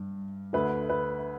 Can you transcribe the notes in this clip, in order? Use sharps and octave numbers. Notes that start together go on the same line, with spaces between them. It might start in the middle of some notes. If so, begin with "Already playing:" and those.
Already playing: G2
D2 D3 B4
B4